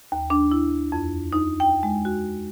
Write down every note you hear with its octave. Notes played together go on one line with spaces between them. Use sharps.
D#2
D4
E4
F2
D#4
G5
G#3
F#4